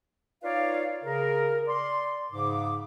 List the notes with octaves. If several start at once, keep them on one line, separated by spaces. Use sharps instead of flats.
D#4 F4 B4 C#5 D5 F5
C#3 A#4
D5 C6
G#2 C#3 D6